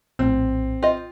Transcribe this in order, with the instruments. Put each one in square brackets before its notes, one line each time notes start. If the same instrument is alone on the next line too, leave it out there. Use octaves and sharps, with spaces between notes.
[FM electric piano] A#1 A2 [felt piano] C4
[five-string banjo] F4 D#5 [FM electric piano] G5